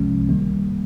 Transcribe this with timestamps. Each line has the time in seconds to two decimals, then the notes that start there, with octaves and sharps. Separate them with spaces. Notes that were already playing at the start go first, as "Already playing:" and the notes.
Already playing: C2 C3 F3 G#3 C#4
0.29 D#3 G3 A#3